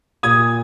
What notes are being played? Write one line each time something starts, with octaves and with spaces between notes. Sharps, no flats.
A#2 D#6 G#6